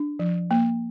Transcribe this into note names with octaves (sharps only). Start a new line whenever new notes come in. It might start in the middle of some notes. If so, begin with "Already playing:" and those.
Already playing: D4
F3
A#3